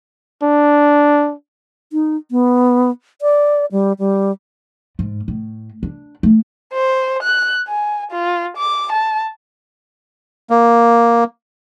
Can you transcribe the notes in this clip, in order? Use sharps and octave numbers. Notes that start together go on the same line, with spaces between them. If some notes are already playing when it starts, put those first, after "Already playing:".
D4
D#4
B3
D5
G3
G3
G#2
A2
D4
A3
C5
F#6
G#5
F4
D6
A5
A#3